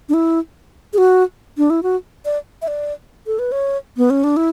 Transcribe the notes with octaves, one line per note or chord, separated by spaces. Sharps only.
D4
E4
G#4
F#4
D4
E4
F#4
D5
E5
D5
A4
B4
C#5
B3
C#4
D4
E4